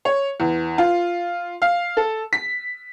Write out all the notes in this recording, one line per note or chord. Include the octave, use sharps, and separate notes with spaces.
C#5
E2
F4
F5
A4
B6